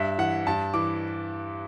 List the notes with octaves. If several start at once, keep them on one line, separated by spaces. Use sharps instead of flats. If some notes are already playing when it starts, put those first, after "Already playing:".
Already playing: G2 E5
E3 F#5
G2 A5
E3 D6